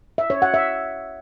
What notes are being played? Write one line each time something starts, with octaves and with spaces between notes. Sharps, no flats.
E5
C#5
F#5
E5